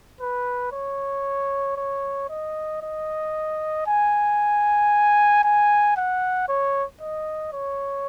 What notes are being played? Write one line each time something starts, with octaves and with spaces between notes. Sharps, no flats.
B4
C#5
C#5
D#5
D#5
G#5
G#5
F#5
C#5
D#5
C#5